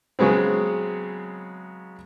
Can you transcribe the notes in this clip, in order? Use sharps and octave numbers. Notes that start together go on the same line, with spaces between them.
C#3 F#3 G#3 B3 C4